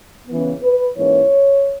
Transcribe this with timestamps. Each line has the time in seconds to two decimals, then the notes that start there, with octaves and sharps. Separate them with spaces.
0.28 C#3 E3 B3
0.62 B4
0.97 G#2 E3 A#3 C#4 C#5